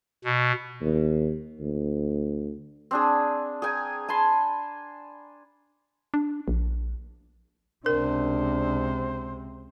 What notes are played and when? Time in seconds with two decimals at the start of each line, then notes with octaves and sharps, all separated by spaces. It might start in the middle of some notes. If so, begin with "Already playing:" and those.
0.24 B2
0.81 D#2
1.60 D2
2.91 C4 D4 G#4
3.62 G#4 G5 G#5 A#5
4.08 G#5 A5 B5 C6
6.14 D4
6.48 A#1
7.86 C#2 C3 D4 A#4 C5